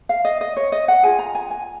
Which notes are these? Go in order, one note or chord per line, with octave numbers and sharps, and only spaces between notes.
F5
D#5
D#5
C#5
D#5
F#5
F4 G#4 G#5
A#5
G#5
G#5